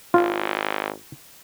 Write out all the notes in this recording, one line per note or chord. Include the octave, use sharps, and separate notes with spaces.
G#1 F4